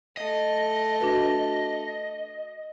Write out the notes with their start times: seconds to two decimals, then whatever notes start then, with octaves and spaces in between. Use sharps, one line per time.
0.17 A3 D#5
1.00 D4 F#4 B4